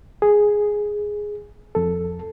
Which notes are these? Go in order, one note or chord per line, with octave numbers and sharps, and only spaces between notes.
G#4
F2 A4